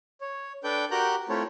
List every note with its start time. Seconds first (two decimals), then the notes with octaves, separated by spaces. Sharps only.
0.21 C#5
0.64 D4 A4 B4 D5 G5 G6
0.91 F#4 G4 A#4 A#5 F#6 G6
1.29 A3 C4 E4 F4 A4 C#5